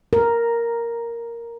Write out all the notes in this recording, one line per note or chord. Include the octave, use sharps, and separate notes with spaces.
A#4